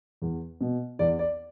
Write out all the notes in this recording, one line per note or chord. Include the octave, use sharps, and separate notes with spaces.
E2
B2
E2 D5
D5